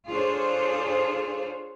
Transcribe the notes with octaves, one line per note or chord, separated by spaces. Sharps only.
D4 F4 G#4 A4 C5 C#5